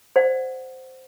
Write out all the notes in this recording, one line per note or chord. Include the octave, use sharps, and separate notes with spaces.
C5 D5 F#5